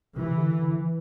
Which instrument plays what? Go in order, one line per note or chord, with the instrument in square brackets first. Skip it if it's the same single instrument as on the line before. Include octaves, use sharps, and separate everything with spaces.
[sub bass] C3 [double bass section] E3
[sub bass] C3
D3
D3
E3